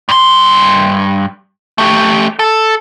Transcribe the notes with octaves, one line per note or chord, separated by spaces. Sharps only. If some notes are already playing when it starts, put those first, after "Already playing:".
G2 C6
A3 G4
A4